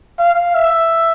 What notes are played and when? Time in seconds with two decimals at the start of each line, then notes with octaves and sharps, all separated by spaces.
0.19 F5
0.55 E5